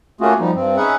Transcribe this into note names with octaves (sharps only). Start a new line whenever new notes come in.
A3 A#3 C#4 F4 F#4 G#4
F3 G3 D#4
G2 C4
C#4 D#4 G#4 B4 E5 F#5